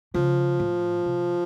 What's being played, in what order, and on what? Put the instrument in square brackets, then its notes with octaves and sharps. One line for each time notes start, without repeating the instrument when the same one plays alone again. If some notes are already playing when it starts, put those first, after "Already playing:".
[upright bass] C#3 [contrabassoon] F3
[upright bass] A2
C3